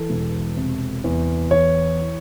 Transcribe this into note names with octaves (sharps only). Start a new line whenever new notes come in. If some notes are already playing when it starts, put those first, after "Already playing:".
Already playing: E3 A4
E1
C3
E2
E3 C#5